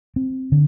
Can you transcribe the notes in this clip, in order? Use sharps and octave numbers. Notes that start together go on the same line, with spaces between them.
C4
D3